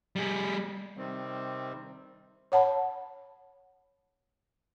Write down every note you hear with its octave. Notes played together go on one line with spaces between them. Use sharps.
G3 G#4
C3 D#3 G3 C4
C#5 F#5 A5 B5